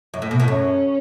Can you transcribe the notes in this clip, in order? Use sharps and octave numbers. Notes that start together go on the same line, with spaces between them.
F#2
A2
B2
A2
F#2 C#4